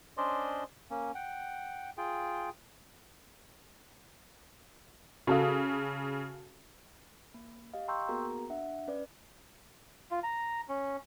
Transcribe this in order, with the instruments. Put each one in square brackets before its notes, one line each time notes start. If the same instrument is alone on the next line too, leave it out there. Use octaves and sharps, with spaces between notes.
[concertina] C#4 D4 C5 D5 D#5 C6
A#3 C#4
F#5 G5
F4 G#4 G5
[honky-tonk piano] C#3 D#6 [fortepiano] F#4 A4 F5
[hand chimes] A#3
G4 D#5 F5
G5 A#5 C6 C#6 E6 G6
A#3 B3 F#4 G#4 A#4 A#5
D4 E5 F#5
C#4 B4 D5
[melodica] F4
A#5
C#4